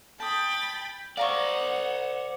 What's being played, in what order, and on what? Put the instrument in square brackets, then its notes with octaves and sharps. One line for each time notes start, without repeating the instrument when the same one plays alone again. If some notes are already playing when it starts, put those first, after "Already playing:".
[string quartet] G5 B5 A6 [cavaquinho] A5 D#6
[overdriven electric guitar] C5 D5 [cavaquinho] F5 A#5 C#6 [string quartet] F#5